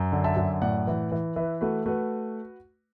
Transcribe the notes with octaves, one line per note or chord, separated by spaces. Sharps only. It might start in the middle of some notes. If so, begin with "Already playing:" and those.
Already playing: F#2
D3
E5 A5
F#2
A2 D5 F#5
E3
E3
E3 B4 E5
A3 F#4 B4
A3 F#4 B4